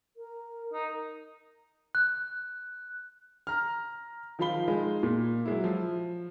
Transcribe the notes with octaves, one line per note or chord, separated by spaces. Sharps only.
A#4
D#4
F#6
A#5 F6
D#3 F3 F4 F5 B5 G7
G#3 D#4 F4 G#4
A#2
F#3 G#3 E4
F3